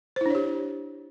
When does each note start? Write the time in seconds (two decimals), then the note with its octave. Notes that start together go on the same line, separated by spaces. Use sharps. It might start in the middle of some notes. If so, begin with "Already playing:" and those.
0.16 C5
0.21 E4
0.26 D4
0.30 C#5
0.35 G4